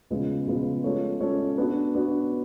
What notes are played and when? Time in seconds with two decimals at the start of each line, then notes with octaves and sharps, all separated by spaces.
0.10 C#3 F3 G#3 B3 F4
0.47 C#3 F3 G#3 B3 F4
0.84 G#3 C#4 F4 A4 C#5
1.20 G#3 C#4 F4 A4 C#5
1.57 B3 D4 F#4
1.94 B3 D4 F#4